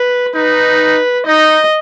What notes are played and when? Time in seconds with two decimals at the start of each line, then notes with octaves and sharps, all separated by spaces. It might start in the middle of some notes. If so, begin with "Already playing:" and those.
Already playing: B4
0.36 D#4 B4
1.27 D#4 D#5